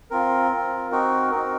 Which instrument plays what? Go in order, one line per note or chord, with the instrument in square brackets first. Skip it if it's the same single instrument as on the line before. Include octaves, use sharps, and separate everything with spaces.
[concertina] C4 F4 A#4
C4 F4
C4 D#4 F#4 A#4
C4 D#4 F#4 A#4